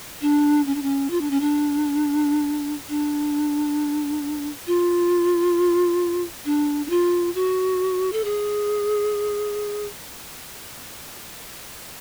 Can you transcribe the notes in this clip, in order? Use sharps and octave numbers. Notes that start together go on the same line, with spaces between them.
D4
C#4
D4
C#4
F4
D4
C#4
D4
D4
F4
D4
D4
F4
F#4
A4
G#4